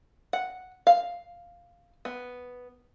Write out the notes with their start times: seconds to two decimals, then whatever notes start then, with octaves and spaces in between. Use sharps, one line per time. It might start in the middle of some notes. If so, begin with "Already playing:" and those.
0.33 F#5
0.87 F5
2.05 B3